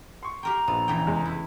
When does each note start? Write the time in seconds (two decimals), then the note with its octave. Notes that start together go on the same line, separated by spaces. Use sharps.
0.23 C6 C#6
0.43 G4 A#4 G5 A#5
0.68 A#1 B3
0.88 C#3 E3 G5
1.06 F1 E2 G#3
1.26 E4